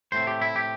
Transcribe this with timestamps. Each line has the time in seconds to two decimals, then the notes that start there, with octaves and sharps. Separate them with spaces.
0.12 A2 A3 C4 C5
0.27 G4
0.41 E4
0.56 G4